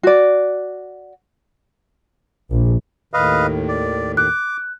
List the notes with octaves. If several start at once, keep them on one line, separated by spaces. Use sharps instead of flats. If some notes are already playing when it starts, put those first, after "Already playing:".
F#4 D5
A#1
D#2 A2 D#3 B4 D#5 F5
D5
D6 F#6